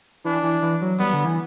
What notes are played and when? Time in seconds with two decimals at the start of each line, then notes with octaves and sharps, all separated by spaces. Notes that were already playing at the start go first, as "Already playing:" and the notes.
0.25 E3 D4
0.43 E3
0.62 E3
0.82 F#3
0.99 G3 B3
1.13 D3
1.25 E3